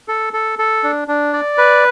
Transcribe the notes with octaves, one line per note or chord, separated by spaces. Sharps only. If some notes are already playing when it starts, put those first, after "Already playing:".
A4
A4
A4
D4
D4
D5
B4